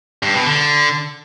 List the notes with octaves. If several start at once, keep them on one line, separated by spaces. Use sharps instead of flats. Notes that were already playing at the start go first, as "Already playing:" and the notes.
G2
B2
D3